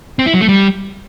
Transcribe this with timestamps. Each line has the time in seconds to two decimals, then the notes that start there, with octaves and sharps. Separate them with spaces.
0.19 C4
0.26 E4
0.34 F#3
0.41 A3
0.48 G3